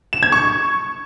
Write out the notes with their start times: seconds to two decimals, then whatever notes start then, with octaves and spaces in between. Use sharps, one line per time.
0.13 E7
0.23 G#6
0.32 C#6